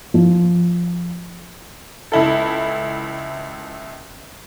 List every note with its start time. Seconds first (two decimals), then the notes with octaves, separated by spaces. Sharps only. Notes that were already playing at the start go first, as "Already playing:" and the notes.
0.14 F3
2.12 C#2 E4 A4